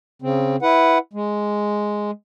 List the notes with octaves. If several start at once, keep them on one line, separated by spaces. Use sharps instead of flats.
C#3 C4
E4 B4 F#5
G#3